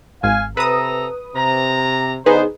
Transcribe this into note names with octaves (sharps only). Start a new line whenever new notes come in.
G#1 F5 G#5
C3 A4 B4 A#5 D#6
C3 A#5
D3 B3 D#4 G#4 B4 C5